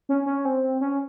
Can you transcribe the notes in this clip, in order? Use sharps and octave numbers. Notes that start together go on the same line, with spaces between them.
C#4
C#4
C4
C#4